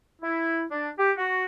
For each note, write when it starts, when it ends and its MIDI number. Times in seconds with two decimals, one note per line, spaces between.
0.22 0.63 64
0.70 0.90 62
0.98 1.11 67
1.18 1.45 66